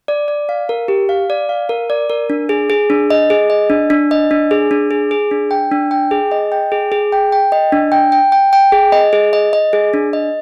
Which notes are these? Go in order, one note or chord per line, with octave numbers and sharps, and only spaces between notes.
D5
D5
F5
A#4
G4
F5
D5
F5
A#4
D5
A#4
D4
G#4
G#4
D4
D#5
G#4
D#5
D4
D4
D#5
D4
G#4
D4
G#4
G#4
D4
G5
D4
G5
G#4
D#5
G5
G#4
G#4
G5
G5
D#5
D4
G5
G5
G5
G5
G#4
D#5
G#4
D#5
D#5
G#4
D4
D#5